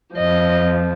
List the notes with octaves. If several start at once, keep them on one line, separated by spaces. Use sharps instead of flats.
F2 F3 D#5